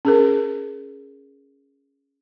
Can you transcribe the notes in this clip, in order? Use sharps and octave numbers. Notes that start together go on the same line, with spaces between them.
C#4 G#4 A#4